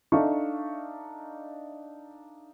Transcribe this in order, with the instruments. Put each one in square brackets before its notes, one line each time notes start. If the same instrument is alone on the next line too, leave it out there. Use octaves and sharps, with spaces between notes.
[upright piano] D4 D#4 A4 E5 F5 C#6